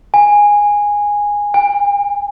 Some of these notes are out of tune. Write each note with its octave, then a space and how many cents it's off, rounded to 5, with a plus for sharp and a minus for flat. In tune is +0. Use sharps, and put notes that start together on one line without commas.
G#5 -10
G#5 -45